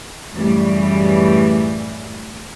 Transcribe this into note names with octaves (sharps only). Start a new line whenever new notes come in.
F#2 A2 C#3 E3 G3